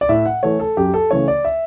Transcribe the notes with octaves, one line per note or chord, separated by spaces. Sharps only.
D5
A2 E5
F#5
E3 A3 C#5
A4
F#2 G4
A4
C#3 E3 A3 C#5
D5
E5